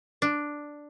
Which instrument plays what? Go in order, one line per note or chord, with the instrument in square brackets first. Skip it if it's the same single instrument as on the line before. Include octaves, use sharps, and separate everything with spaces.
[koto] D4